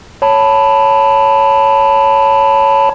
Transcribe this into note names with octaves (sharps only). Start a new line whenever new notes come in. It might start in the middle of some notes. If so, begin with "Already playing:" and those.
C#5 A5 B5